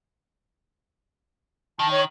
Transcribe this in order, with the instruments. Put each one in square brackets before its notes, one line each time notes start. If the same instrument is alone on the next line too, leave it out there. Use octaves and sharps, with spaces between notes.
[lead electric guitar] D#3 [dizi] A5
[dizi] C#5